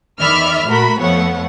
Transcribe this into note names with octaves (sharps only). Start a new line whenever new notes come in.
E2 D#3 D5 E5 B5 F6
A#2 A3 F#4 A#4 B5
F2 F3 A3 B3 C#5 F#5